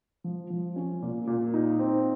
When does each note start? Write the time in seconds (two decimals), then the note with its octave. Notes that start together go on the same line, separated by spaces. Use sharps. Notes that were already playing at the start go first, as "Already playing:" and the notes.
0.24 F3
0.50 F3
0.76 C#4
1.02 A#2
1.27 A#2
1.54 D#4
1.79 C4